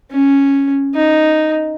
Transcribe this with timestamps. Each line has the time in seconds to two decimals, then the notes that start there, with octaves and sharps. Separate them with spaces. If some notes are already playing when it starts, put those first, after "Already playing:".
0.11 C#4
0.95 D#4